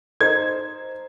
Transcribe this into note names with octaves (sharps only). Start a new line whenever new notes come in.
D#4 A4 C5 G#6